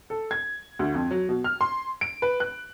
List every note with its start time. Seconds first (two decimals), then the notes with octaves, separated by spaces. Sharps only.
0.10 A4
0.31 G#6
0.79 D2
0.94 F2
1.11 F#3
1.29 B2
1.44 F6
1.61 C6
2.01 D7
2.22 B4
2.40 F#6